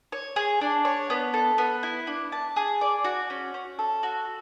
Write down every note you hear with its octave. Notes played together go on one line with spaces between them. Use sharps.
C#5
G#4
D4
C#5
B3
A4
B3
E4
D4
A5
G#4
D5
F#4
C#4
C#4
A4
F#4